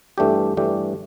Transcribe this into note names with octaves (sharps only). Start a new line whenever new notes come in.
G2 E3 A3 D4 G4
G2 E3 A3 D4 G4